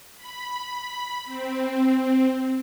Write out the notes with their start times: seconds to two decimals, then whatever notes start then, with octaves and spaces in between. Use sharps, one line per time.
0.17 B5
1.25 C4